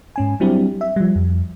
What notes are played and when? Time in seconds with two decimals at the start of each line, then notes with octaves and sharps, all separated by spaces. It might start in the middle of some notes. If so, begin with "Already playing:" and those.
0.16 G#2 C#4 G#5
0.40 F#3 G3 C4 D4 E4 G4
0.81 E5
0.96 F3 G3
1.16 F2